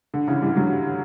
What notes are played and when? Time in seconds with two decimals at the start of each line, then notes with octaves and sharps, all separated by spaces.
0.14 D3
0.28 C#3 E3
0.42 E3 G3
0.56 D3 F#3